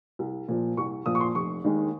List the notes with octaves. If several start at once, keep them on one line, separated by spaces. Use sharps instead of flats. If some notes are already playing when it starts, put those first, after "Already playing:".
C2
A#2 F3
C2 C#6
A#2 F3 D#6
C#6
C6
F1 C#6
D#2 D#3 G#3